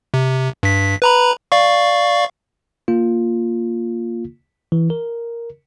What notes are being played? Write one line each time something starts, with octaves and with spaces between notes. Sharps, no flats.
C3
G2 B6
B4 A#5 B5
D5 F5 C#6
A#3 F4
E3
A#4